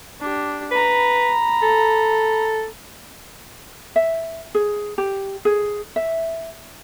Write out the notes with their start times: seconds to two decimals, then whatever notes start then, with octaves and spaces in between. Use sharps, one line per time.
0.20 D4 G4
0.71 B4 A#5 B5
1.62 A4
3.96 E5
4.55 G#4
4.98 G4
5.45 G#4
5.96 E5